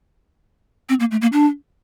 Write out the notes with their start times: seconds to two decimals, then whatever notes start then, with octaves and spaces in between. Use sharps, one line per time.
0.89 C4
1.00 A#3
1.11 A3
1.22 A#3
1.33 D4